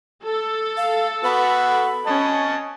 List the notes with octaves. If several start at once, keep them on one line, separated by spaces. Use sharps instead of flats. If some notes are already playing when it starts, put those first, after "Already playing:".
A4
F5
B3 F#4 B5
C#4 D#5 A5